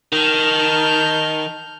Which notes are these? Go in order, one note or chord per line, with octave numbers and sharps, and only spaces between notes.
D#3 A5 F6 G6